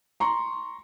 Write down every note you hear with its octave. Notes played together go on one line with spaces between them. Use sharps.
A#5 C6 C#6